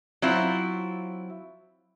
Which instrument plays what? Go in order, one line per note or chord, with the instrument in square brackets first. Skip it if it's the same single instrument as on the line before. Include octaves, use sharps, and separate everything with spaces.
[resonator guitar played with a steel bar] F#3 C4 E4 F4